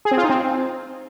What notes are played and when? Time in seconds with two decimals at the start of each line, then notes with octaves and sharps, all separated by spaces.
0.05 G#4
0.11 C4
0.17 F4
0.24 D#4
0.30 C4